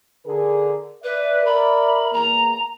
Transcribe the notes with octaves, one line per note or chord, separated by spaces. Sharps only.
D3 G#4 A#4
B4 D5 E5
A#4 B5
E2 A#3 A#5